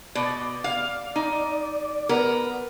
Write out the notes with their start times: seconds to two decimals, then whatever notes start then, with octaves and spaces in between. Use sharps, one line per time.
0.15 B2 D5
0.64 F5
1.16 D#4
2.09 B3 A#4